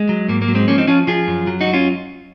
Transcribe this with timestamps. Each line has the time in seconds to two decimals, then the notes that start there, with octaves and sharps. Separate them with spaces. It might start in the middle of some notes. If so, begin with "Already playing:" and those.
Already playing: G#3
0.09 F#3
0.28 G#2 A#3
0.42 A#3
0.48 F#3
0.55 G#3 C4
0.68 F3 A#3 C#4
0.78 C4 D#4
0.87 F3 C#4 F4
1.07 F3 F4 G#4
1.27 F#2
1.47 F#3
1.61 D#4 F#4
1.67 F#3
1.73 C#4 F4